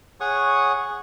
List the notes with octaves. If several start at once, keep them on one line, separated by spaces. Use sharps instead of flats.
G#4 C#5 F#5 C#6 D#6